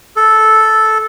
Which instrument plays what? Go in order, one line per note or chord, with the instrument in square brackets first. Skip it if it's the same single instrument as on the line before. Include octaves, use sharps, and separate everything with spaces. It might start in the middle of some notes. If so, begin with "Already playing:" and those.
[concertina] A4